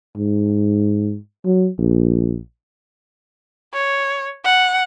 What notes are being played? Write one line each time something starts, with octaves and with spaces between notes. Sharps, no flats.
G#2
F#3
A#1
C#5
F#5